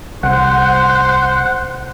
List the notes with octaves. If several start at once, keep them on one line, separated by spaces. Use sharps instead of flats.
C2 C5 F#5